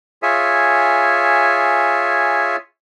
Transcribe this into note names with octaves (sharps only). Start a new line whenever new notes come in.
F4 G#4 C#5 E5 G#5